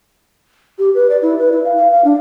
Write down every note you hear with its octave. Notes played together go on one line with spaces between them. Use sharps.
G4
B4
D5
E4
B4
E4
F5
F5
F5
D4